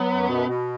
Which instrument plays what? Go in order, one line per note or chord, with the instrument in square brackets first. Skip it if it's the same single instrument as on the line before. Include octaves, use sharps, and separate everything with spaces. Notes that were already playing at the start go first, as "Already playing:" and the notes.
Already playing: [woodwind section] F#3 [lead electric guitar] B3
[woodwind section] F#2
B2
B2